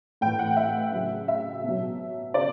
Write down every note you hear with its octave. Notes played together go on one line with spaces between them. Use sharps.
A2 E3 G5
F#5
E5
C#3 F#3
E5
B2 F#3
C#3 D5